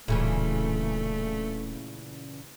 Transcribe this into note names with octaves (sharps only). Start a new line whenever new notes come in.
D1 A#2 C#3 E3 A3